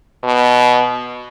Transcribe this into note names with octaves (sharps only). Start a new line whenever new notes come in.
B2